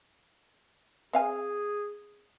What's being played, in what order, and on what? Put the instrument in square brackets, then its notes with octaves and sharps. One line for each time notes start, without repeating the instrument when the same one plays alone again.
[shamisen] C4 F5 G#5 [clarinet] G#4